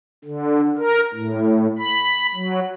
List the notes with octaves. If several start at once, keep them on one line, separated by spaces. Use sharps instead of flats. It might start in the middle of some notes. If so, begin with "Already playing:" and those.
D3
A#4
A2
B5
F#3